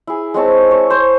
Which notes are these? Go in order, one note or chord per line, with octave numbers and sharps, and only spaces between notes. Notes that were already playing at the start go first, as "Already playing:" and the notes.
E4 G#4
G#3 C4 C#5 A5
C#5 A5
C5